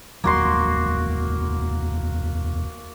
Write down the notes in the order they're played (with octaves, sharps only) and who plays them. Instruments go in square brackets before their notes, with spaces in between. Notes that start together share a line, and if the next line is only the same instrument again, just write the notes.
[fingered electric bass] F1 D#2 F#3 [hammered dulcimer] A#3 F#4 C6